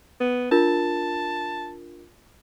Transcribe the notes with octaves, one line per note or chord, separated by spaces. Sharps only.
B3
D4 F4 A#4 A5